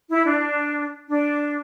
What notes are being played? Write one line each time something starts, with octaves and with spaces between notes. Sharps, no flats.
E4
D4
D4